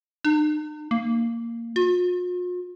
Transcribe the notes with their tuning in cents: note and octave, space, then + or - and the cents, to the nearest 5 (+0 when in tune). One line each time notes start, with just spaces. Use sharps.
D#4 -45
A#3 -10
F4 +45